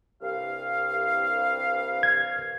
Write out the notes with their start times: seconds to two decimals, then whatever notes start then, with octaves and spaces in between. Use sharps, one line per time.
0.22 C2 G2 F5
2.03 G#6